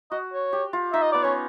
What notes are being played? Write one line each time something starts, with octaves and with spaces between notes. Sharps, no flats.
F#4 D#5
C#5
G4
F4
D#4 E5
D#5
B3 D5
C#4 C#5